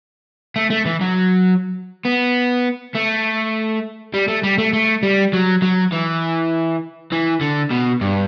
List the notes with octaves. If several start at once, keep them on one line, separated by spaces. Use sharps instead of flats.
A3
A3
E3
F#3
B3
A3
G3
A3
G3
A3
A3
G3
F#3
F#3
E3
E3
D3
B2
G2